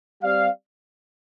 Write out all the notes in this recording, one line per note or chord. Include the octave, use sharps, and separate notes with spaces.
G3 C4 G4 D5 F5